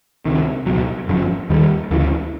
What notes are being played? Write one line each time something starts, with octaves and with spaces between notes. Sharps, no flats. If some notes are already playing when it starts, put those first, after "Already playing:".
C#2 C3 D#3
C#2 B2 F#3
G1 F#2 D3 F3
D#2 D#3 G3
D2 C#3 E3